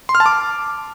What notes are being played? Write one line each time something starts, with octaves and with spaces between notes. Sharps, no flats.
C6
F6
A5
D6